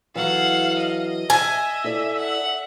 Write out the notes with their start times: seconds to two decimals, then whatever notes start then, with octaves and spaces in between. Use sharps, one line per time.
0.15 E3 F#3 A4 F5 F#5
0.79 D#5
1.30 E5 G#5
1.84 E4 A4 D5
2.17 F#5